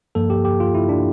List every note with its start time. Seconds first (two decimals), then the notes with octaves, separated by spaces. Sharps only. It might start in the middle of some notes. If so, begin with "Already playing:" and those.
0.15 G2 F3 A#3 A4
0.30 G4
0.45 G4
0.60 F4
0.75 E4
0.89 D4